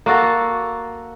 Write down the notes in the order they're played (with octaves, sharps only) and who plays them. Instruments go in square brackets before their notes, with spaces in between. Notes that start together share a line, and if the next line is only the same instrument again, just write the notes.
[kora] A#3 F#4 A4